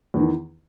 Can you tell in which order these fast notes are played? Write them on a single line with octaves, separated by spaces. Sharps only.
E2 E3 D#3